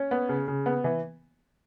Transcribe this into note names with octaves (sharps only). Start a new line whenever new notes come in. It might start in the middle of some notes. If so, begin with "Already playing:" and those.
Already playing: C#4
B3
C#3
C#3
B3
E3